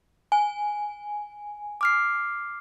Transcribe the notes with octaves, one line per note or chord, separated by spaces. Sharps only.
G#5
D6 F6 C7